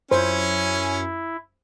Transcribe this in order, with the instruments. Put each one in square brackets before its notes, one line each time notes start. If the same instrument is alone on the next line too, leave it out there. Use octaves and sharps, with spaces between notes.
[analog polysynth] F#2 [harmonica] C#4 G#5 [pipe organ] E4 [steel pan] C5